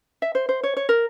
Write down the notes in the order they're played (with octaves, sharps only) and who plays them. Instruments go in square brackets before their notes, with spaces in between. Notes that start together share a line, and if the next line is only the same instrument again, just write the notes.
[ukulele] E5
C5
C5
C#5
C#5
A#4